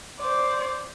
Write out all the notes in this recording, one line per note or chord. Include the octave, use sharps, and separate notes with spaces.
C5 D5